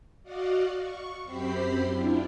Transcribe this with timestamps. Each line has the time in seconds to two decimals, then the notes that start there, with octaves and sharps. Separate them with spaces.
0.23 F#4 D5 D#5 F5 F#5
0.74 C#6
1.23 F#2 C4 G4 C5 B5 C7
1.86 D4 E4 F4